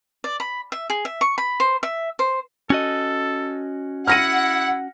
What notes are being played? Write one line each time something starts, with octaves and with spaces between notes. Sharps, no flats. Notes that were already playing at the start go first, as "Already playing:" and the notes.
D5
B5
E5
G#4
E5
C#6
B5
C5
E5
C5
C#4 F#4 A4 D#5
E4 F#5 F6 A#6 D#7